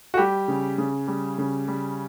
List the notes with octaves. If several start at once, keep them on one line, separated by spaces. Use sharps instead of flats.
F#4
G3 G4
C#3
C#3
G3
C#3
G3